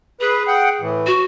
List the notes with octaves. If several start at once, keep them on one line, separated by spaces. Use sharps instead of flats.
G#4 B4
F#5 G5
A2 E3
F#4